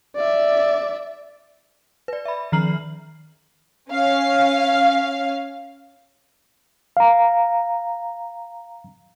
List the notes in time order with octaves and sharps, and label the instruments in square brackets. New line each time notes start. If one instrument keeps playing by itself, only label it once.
[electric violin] D5 E5
[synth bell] B4 D5
E5 B5
D#3 F3 A#5 F6 C7 F#7
[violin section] C#4 F5
[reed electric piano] F5 A#5